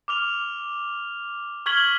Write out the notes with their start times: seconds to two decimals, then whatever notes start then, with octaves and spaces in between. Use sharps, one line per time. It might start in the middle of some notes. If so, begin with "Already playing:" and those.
0.08 D6 F6 F7
1.66 C#6 F6 G#6 B6 F#7 G7